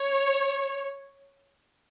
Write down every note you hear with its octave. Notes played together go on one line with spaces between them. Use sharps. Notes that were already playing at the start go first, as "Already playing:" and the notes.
Already playing: C#5